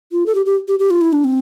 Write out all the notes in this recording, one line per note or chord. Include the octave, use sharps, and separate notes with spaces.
F4
A4
G4
G4
G4
G4
F4
E4
D4
C4